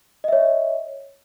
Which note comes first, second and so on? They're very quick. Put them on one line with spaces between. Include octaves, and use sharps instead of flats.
D#5 E5 C#5